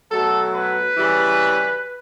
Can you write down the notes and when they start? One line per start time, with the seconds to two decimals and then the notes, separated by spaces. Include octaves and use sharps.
0.12 B2 F#3 A3 A4
0.54 B4
0.97 C#3 E3 G3